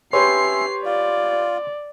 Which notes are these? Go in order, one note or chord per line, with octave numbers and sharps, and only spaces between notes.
C#4 G4 B4 C#5 E5 C6 C7
F4 D5